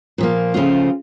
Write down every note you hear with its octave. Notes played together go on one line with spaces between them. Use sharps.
A#2 F3 A#3
C#3 F3 A3 C4 F4